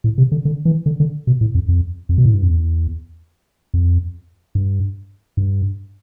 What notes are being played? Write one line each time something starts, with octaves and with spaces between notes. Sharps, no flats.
A2
C3
D3
D3
E3
D3
D3
B2
A2
F2
F2
F2
B2
A2
G2
F2
E2
F2
G2
G2